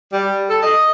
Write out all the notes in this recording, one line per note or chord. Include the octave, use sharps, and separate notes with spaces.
G3
A4
D#5